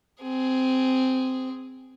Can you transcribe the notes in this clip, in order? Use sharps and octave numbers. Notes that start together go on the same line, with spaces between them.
C4 G#4